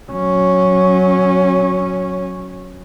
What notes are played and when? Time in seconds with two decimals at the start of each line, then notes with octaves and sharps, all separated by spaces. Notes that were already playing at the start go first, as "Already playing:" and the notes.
0.11 F#3 C#4